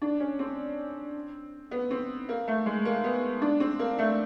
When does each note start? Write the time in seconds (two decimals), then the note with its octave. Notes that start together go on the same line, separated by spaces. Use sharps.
0.02 D4
0.20 C#4
0.39 C4
1.71 B3
1.91 C4
2.29 A#3
2.48 A3
2.66 G#3
2.85 A#3
3.04 B3
3.42 D4
3.60 C4
3.79 A#3
3.99 A3